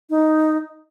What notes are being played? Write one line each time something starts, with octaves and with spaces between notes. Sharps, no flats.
D#4